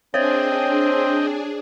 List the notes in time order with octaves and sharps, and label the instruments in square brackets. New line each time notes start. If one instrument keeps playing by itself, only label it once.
[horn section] C4 [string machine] D4 G#4 [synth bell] C5 C#5 [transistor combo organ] D#5 G5